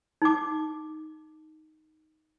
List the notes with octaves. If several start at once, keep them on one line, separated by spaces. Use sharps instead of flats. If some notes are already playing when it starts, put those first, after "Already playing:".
D#4 D6